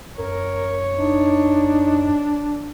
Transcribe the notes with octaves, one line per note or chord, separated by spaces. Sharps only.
F#2 A#4 C#5
D4 D#4